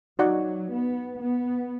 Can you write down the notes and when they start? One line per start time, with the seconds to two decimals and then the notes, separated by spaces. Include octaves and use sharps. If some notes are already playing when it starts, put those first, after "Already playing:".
0.19 F#3 D#4 F#4 D5 F#5
0.69 B3
1.21 B3